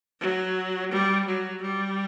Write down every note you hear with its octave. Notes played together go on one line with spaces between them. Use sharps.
F#3
G3
F#3
G3